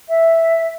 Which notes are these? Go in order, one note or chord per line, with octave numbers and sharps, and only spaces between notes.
E5